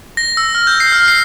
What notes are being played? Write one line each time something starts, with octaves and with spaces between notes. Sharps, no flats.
A#6
E6
F6
G6
C7
F6
C7